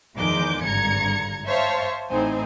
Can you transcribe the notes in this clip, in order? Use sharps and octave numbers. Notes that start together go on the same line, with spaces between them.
E2 D#3 F3 G#3 D6 G6
G#1 G2 D3 A#5 G#6 C#7
C5 C#5 E5 F5 A5 C#6
A1 A2 C4 D#4 C5 G#5